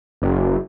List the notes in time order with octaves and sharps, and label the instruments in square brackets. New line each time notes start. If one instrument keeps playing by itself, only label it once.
[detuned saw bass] F#1